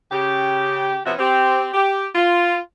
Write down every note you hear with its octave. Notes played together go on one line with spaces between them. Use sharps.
C#3 G4
C3 F3 B3 C#4 F#4 E5
C4 G4
G4
F4